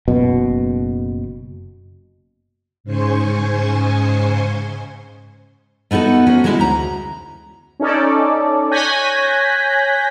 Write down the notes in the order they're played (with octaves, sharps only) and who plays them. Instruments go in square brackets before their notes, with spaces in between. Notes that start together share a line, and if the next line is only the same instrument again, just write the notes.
[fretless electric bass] F#1 B2
[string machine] G#2 C#3 C5 G#5 C6 C#6
[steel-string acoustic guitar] A3 B3 D#4 F#4 A4
C#4 F#4 A#4 C5
F#3 G#3 C#4 D#4 E4 F#4
D2 A#5
[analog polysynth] C#4 D#4 A4 D5
C#5 G#5 F#6 G6 A#6 B6